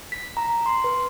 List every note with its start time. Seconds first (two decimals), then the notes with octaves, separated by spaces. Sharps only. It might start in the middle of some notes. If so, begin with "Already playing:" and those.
0.12 B6
0.37 A#5
0.66 C6
0.84 B4